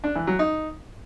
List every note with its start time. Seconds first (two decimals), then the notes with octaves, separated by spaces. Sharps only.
0.04 D4
0.15 E3
0.27 F#3
0.39 D#4